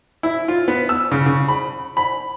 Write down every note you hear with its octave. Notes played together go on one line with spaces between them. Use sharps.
E4
F4
B3
E6
C#3
C#3
B5
B5